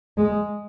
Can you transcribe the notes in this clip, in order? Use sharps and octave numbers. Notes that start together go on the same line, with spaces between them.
G#3